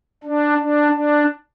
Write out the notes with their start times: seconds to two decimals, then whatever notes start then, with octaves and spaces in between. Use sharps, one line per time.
0.24 D4
0.58 D4
0.92 D4